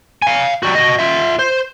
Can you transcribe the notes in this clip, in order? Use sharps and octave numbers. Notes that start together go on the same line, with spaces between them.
F5 G#5
G3 F#4
F#4 D#5
F4 E5
C5